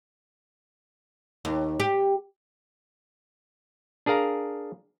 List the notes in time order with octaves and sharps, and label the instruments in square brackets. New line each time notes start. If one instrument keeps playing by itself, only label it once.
[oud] D#2
G4
[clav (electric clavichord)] D4 G#4 A#4 F5 A#5